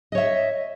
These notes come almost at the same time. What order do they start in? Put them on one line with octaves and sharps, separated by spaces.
D#5 C#5 E5